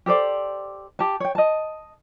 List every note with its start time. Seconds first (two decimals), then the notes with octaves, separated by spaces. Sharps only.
0.06 G4 A4 C5 D5
0.99 G4 A5
1.20 C#5 G5
1.35 D#5 A5